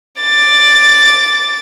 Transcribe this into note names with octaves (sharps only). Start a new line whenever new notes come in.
D6 A6